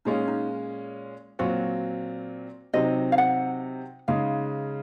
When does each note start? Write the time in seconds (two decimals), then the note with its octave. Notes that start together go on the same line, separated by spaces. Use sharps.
0.05 A#2 G#3 C#4 D#4 F4
0.28 D#4
1.39 A#2 F#3 C4 F4 F#4
2.73 C3 F#3 C4 D#4 D#5
3.12 F5
3.18 F#5
4.08 C#3 G#3 D#4 F5